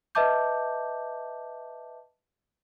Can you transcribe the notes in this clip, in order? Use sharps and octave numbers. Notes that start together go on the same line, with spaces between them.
B4 D#5 E5 A5 D6 G6